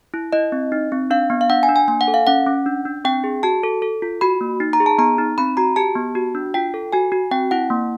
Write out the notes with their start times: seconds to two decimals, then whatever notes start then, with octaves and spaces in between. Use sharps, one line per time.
0.14 E4
0.33 E4 D#5
0.52 C4
0.72 D#4
0.92 C4
1.10 D4 F5
1.30 B3
1.41 F5
1.50 D4 F#5
1.63 G#5
1.69 D4
1.76 G#5
1.88 A#3 G#5
2.01 F#5
2.08 A4
2.14 F5
2.27 C#4 F#5
2.46 C#4
2.66 D4
2.86 D4
3.05 C4 G5
3.24 G#4
3.43 F#4 A5
3.63 A4
3.82 A4
4.02 F4
4.21 F#4 B5
4.41 A#3
4.60 D#4
4.73 A#5
4.80 G#4
4.86 A5
4.98 B3 A#5
5.18 D#4
5.38 C4 B5
5.57 F#4 A#5
5.76 G4 A5
5.95 B3
6.15 F#4
6.35 D4
6.54 F4 G5
6.74 A4
6.93 F#4 G#5
7.12 F#4
7.31 C4 G5
7.51 E4 F#5
7.70 A#3